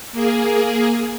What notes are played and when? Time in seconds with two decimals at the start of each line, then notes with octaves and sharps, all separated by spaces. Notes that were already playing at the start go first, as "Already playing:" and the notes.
0.12 A#3 G#4